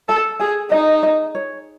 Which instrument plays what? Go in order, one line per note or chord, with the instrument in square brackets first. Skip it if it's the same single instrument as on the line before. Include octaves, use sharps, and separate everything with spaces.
[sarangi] A4 [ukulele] A5
[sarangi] G#4 [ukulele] G#5
[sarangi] D#4 [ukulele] D#5
[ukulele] D#5
C#5